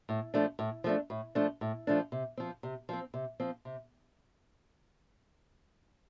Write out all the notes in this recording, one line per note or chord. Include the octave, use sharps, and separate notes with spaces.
A2
F3 A3 D4
A2
F3 A3 D4
A2
F3 A3 D4
A2
F3 A3 D4
C3
F3 C4
C3
F3 C4
C3
F3 C4
C3